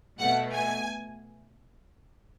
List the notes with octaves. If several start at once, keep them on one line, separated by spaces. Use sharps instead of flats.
B2 A3 F#5
G#5